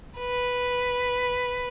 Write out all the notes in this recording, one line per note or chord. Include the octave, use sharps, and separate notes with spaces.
B4